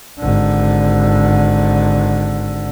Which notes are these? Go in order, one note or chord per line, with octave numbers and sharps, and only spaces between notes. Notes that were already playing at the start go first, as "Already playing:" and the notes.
G#1 D3